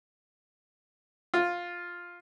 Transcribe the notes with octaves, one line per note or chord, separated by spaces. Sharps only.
F4